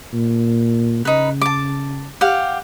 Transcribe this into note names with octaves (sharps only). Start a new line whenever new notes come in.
A#2
C#3 D#4 B4
A5 D6
G4 F5 F#5